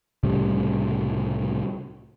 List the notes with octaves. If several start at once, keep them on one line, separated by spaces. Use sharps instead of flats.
C2 A2 C#3 G3